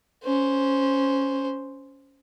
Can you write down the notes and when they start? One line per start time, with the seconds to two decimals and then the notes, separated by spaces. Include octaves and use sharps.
0.24 C#4 C5